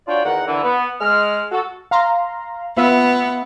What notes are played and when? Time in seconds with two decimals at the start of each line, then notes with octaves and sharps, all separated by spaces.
0.08 D4 F4 F#4 C#5 D5 G5
0.24 E2 D#3 A#4 F#5
0.47 D3 E3
0.63 B3
1.01 G#3 F6
1.52 F#4 A4
1.91 F5 A#5 C6
2.77 B3 F4 B4 E5